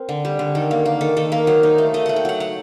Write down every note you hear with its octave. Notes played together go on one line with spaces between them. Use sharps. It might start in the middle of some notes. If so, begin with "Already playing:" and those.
Already playing: C4 A#4
D3
G3
D3
D#3 A4
A#3
A#3
D#3 A4
D#3 A4
A#3 A#4
F#3 C5
D#4
A3
A3 D#5
A3 F#5
G5
F#3 F#5
F#3 F#5